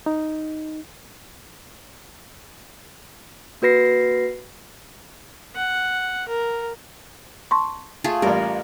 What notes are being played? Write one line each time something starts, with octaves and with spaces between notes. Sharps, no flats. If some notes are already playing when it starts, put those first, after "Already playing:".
D#4
A#3 F#4 B4 A#6 C7
F#5
A#4
A5 C6 C#6
A3 F4 G#4
A1 G3 A#4